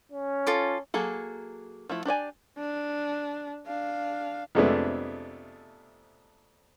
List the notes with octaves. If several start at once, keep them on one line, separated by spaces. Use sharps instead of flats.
C#4
F4 A4 D6
F#3 A#3 G#4 A4
F3 A3 E4
D4 G4 D5 G#5
D4
D4 F5
F2 C3 G#3 A3 B3 D4